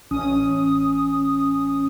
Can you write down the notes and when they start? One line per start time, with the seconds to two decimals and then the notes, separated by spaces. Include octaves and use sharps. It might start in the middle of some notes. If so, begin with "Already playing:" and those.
0.11 A1 C#4 D#6